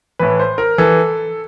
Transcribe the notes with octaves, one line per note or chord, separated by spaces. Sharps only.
A2 E3 B4
C5
A#4
E3 A4